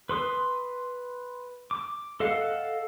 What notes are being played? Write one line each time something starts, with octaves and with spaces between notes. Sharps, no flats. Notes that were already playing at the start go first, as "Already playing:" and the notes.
B4 C6 D#6
D6
A4 D#5 F5 F#5